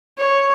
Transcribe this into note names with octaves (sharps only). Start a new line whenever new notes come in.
C#5